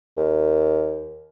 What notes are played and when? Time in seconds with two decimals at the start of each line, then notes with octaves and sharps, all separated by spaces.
0.17 D#2